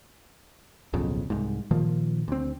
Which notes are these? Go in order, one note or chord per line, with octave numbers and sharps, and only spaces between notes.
D1 B1 F2 C#3
C2 G#2
A#2 D#3 F3 A#3
D2 C4